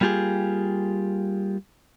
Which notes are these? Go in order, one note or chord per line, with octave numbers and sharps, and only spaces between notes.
G3 A#3 F4 G4 G#4